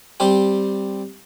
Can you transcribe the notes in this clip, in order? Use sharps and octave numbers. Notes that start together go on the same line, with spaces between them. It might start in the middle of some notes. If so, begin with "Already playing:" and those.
G3 C4 G4